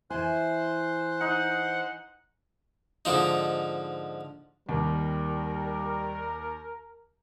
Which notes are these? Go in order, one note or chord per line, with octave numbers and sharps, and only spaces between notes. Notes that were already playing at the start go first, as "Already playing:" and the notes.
E3 E4 C5 G#5 C6 F#6
D#4 D#5 F#5
G#2 D3 F3 D#4
D#2 G3 A#4